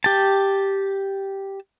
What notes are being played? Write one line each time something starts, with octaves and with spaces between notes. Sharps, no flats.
G4 A5